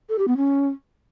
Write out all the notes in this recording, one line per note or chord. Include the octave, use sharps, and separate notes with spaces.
A4
G4
B3
C#4